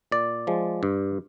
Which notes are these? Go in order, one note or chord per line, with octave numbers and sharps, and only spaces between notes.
A#2 D5
F3 G#3
G2